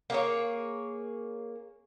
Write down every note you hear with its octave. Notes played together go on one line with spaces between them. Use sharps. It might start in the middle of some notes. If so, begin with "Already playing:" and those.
A#3 G#4 C#5